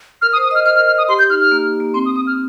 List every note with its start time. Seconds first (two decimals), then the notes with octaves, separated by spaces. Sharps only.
0.22 A#4 F6
0.33 D#6
0.36 C5
0.43 D#6
0.51 D#5
0.55 F6
0.66 C5 F6
0.76 F6
0.79 A#4
0.87 F6
0.98 D#6
1.09 G4 C6
1.19 G6
1.30 D#4 F6
1.41 F6
1.51 A#3
1.80 A#3
1.94 C4 C6
2.06 D#6
2.16 C4 D#6
2.27 F6